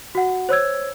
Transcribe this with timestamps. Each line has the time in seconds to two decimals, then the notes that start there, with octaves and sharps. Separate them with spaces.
0.15 F#4 F#5
0.49 C5 C#5 E6 G#6